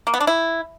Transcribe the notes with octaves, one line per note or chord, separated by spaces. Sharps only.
A#3
B3
D4
E4